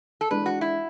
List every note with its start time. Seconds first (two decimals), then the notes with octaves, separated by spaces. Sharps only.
0.21 A4
0.31 E3 G#3 D4 B4
0.46 F#4
0.61 E4